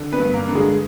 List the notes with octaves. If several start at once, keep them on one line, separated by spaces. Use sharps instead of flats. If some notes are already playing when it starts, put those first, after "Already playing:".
Already playing: D3
B3 B4
G2
A#3 A#4
D3
G#3 G#4